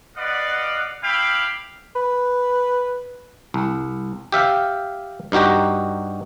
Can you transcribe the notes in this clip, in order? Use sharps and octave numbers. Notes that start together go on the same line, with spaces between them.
B4 D5 D#5 F5 F#5
E4 G4 E5 F5 G5 B5
B4
C2
G4 E5 F5 G5
G2 D#4 F#4 G4 A#5